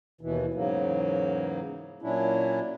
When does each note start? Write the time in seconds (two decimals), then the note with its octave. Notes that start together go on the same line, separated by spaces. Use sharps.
0.21 D#2 B2 E3
0.54 E2 G#2 C#3 F#3 A#3
2.02 A#2 F#3 C#4 D4 E4